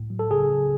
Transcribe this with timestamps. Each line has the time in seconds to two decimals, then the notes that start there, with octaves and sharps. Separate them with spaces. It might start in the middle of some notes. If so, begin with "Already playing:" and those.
Already playing: A2
0.10 F#3
0.19 A4
0.31 C#3 G#4
0.51 F#3